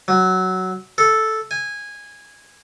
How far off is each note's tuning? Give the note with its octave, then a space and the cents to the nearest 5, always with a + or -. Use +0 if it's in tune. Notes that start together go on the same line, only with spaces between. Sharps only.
F#3 +10
A4 -5
G#5 -15